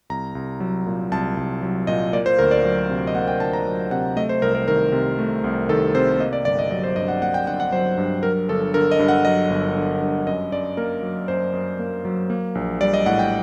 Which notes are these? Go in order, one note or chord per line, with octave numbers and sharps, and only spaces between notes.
C2 A#5
C2
F#3
A#2
C2 A5
C2
F#3
A#2 D#5
A#3 D5
C5
D2 A#4
D5
F#3
C3
D#5
A#3 F#5
G5
D2 A5
A#5
F#3
C3 F#5
A3 D#5
C5
C2 A#4
A#4
D#3 A#4
C3
A3
C2
D#3 A4
C3 C5
A#3 D#5
D5
G1 D5
D#5
F#3 D#5
C5
G2 D#5
F#5
A#3 F#5
G5
G1 F#5
F#5
F#3 C5
G2
F#3 A#4
G1 A4
D3 A#4
D#5
G2
F#5
F#3 D#5
G1
D3
G2
F#2 D#5
F#2 D5
A#3 A#4
F#3
F#2 C5
F#2
A#3
F#3
A#3
A#1
G3 D5
D#5
A2 F#5
G5